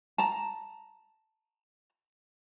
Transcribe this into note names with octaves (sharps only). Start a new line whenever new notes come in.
A5 A#5